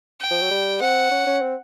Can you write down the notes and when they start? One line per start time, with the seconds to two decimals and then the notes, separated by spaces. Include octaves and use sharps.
0.21 G5
0.31 F3
0.41 F#3
0.51 G3
0.81 C4 F#5
1.11 C#4
1.26 C#4
1.41 C4